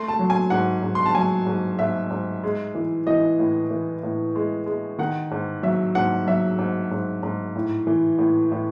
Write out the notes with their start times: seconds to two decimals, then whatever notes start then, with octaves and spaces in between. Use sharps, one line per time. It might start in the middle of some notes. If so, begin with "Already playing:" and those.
Already playing: A3 C6
0.08 A5
0.19 F#3
0.30 G#5
0.50 G#2 F#5
0.83 G#2
0.95 C6
1.06 A5
1.15 F#3 G#5
1.46 G#2
1.79 G#2 E5
2.11 G#2
2.44 G#3
2.75 E3
3.07 E3 D#5
3.39 A2
3.71 E3
4.03 A2
4.36 G#3
4.66 G#3
4.98 D#3 F#5
5.31 G#2
5.63 F#3 E5
5.95 G#2 F#5
6.26 F#3 E5
6.59 G#2
6.91 G#2
7.23 G#2
7.56 A2
7.87 E3
8.18 A2
8.52 A2